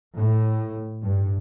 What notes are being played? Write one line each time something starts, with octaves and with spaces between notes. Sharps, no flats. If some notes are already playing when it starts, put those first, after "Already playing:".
A2
G2